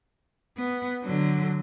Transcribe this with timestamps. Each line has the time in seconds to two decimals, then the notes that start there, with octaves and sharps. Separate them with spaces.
0.57 B3
1.03 D3 F#3